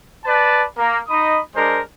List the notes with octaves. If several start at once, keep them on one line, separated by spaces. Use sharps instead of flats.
B4 D5 A5
A#3 A#4
D#4 D#5 B5 D#6
G#3 D4 A#4 C5